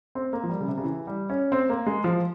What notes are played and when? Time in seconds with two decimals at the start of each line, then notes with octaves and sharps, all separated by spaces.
0.15 C4
0.33 A#3
0.43 F3
0.50 G3
0.60 C#3
0.67 C3
0.78 C#3
0.84 E3
1.07 G3
1.30 C#4
1.52 C4
1.69 A#3
1.86 G#3
2.04 F3